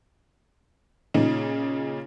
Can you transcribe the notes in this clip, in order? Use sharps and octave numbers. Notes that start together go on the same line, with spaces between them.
A#2 C#3 D#4